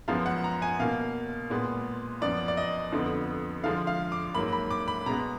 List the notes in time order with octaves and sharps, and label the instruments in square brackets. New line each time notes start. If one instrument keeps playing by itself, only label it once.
[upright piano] F#2 F3 G#3 B3 F5
F#5
A#5
G#5
B2 A#3 F5
A#2 G#3 B3
F#2 F3 B3 D5
D5
D#5
F2 D3 F3 B3
D3 F3 G#3 F5
F5
D6
G#2 F#3 A#3 B5
B5
D6
B5
B2 G#3 B3 A#5